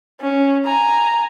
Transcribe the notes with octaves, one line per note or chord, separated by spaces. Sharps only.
C#4
G#5 A#5